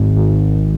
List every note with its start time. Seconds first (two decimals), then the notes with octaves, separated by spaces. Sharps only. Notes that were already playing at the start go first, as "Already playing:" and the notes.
Already playing: G#1
0.15 G#1